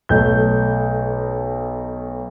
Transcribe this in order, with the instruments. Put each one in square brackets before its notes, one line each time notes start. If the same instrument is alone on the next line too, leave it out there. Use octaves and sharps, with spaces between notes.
[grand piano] B1 A3 G6